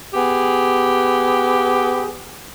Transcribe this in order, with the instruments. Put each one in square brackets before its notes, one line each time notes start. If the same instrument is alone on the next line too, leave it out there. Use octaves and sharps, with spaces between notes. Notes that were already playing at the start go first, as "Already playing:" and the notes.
[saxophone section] B3 G4 G#4